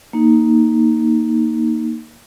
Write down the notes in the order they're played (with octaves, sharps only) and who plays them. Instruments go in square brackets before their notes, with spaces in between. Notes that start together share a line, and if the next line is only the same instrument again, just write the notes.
[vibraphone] A#3 D#4